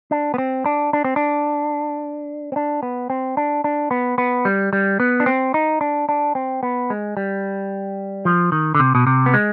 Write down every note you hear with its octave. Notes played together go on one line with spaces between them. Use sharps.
D4
B3
C4
D4
D4
C4
D4
C4
D4
B3
C4
D4
D4
B3
B3
G3
G3
B3
D4
C4
D#4
D4
D4
C4
B3
G#3
G3
F3
D#3
D3
C3
B2
C3
B3
G#3